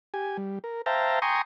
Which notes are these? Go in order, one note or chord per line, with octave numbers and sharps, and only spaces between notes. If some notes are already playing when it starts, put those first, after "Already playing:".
G4 G#5
G3
A#4
C5 E5 F5 G5 A5 A#5
G5 G#5 A#5 C6 C#6 D#6